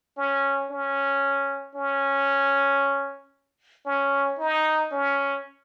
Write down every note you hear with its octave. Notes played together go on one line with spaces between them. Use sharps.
C#4
C#4
C#4
C#4
D#4
C#4